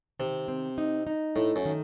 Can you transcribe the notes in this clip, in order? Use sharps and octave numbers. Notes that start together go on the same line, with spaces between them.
C3 D#3
C4
D#4
D#4
A2 A3
F#2
D#3